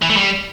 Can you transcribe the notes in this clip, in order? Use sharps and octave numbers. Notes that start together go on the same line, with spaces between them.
E3
A3
G3